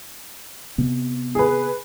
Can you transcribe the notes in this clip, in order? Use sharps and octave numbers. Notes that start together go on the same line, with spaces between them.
C3 B3
G#4 B4